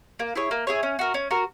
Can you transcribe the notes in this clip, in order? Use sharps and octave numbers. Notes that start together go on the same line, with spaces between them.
A#3
E4 G#4 C#5
A#3
E4 G#4 C#5
C#4
F#4 A#4
C#4
F#4 A#4